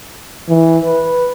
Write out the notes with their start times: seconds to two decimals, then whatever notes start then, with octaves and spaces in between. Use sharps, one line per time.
0.49 E3
0.85 B4